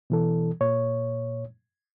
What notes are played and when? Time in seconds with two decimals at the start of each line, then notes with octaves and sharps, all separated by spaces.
0.10 B2 E3 A4
0.61 A#2 C#5